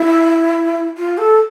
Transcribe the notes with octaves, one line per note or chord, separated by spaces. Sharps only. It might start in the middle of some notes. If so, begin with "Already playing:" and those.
Already playing: E4
F4
A4